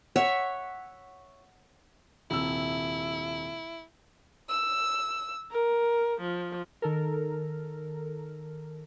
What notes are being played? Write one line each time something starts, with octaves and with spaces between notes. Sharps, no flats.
C#5 E5 F#5
D#1 C3 E4 E6
E6
A#4
F3
D#3 A4 A#4